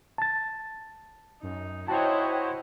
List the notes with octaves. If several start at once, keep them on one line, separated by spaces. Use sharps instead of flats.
A5 A6
F#2 D#4
E4 F#4 C5 C#5 D#5 G5 A5